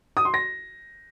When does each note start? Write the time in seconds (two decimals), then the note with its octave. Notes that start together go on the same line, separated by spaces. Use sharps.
0.17 D#6
0.25 C6
0.34 A#6